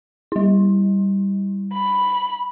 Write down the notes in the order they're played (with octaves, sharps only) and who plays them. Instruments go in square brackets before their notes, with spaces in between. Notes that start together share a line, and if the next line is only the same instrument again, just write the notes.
[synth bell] G3 E4
[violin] B5